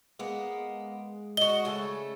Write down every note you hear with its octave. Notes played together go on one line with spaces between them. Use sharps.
G#3 A#3 B3
F#4 D#5 G7
C#3 A3 A4